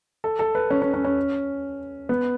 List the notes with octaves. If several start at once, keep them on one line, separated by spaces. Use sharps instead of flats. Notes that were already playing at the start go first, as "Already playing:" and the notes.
A4
A4
B4
C#4
C#4
C#4
C#4
B3